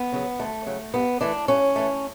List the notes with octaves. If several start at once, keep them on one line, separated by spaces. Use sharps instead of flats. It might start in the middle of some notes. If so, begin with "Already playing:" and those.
Already playing: B3
C#3 F#3
D2 A3
C#3 F#3
G2 B3
E3 A3 D4
G2 C#4
E3 A3